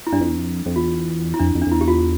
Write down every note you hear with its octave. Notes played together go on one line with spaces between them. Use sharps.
E4
G2 D4
F2
E2
F2
F2
E2 F4
E4
F2 D4
F2
D4
F2
E2 E4
G4
F4